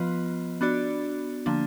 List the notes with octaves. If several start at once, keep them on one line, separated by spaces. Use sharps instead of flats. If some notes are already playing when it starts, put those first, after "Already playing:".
Already playing: F3 B3 F4 B4 D#5
B3 D4 F#4 D5
D3 F3 A#3 D4